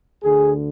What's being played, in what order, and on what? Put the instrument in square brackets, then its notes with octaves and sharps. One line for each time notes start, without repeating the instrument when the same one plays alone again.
[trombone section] D2 D3 G#4